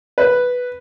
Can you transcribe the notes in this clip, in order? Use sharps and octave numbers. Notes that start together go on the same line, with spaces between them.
B4